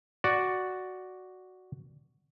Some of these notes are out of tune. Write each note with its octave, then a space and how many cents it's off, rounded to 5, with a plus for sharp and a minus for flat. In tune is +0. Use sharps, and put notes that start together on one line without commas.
F#4 +0 D5 +0